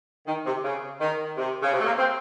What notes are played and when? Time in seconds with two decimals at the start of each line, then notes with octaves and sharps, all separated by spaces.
0.26 D#3
0.45 C3
0.63 C#3
1.00 D#3
1.37 C3
1.62 C#3
1.73 C3
1.80 A3
1.85 A#3
1.98 C4